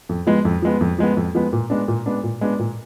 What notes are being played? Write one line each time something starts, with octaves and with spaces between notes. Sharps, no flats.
F2
F3 G#3 B3
F2
F3 G#3 B3
F2
F3 G#3 B3
F2
F3 G#3 B3
A#2
G#3 B3 D4
A#2
G#3 B3 D4
A#2
G#3 B3 D4
A#2